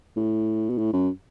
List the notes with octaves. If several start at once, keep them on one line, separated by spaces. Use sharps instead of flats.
A2
B2
A2
F#2